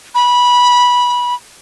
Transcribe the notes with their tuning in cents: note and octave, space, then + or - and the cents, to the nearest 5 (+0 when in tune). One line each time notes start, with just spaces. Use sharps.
B5 -15